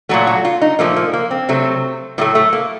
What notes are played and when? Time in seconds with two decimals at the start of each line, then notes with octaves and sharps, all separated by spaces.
0.09 A#2 F#3 A3 F#4
0.27 F#4
0.45 F4
0.62 D#4
0.79 A#2 F3 A3 A#3
0.96 A#3
1.13 A#3
1.31 C4
1.49 C3 F#3 A3
2.18 A2 F#3 A3 A#3
2.35 A3
2.53 A#3